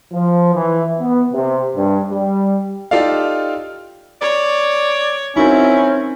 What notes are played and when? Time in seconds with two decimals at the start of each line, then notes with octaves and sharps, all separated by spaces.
0.13 F3
0.54 E3
0.99 B3
1.33 C3
1.76 G2
2.11 G3
2.91 D#4 F4 G4 A4 D5 F5
4.21 C#5 D5
5.36 C4 C#4 D#4 E4 F#4 A#4